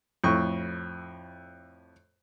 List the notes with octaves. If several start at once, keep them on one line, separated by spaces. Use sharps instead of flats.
F2 A2 C#6